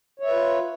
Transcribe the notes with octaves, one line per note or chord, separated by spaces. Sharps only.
F4 B4 C#5 E5